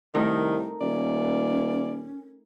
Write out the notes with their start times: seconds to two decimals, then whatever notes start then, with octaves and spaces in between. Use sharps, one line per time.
0.14 C2 D#3 A3 D#4 A#4
0.81 D#1 C#4 D5